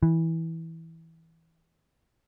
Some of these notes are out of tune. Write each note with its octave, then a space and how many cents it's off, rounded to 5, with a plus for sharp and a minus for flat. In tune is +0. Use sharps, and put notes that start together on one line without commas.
E3 -15